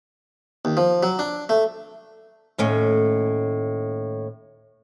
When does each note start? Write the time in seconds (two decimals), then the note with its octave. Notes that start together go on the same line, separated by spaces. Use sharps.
0.65 D#2
0.77 F3
1.03 F#3
1.19 D4
1.49 A3
2.58 D#2 A2 C#4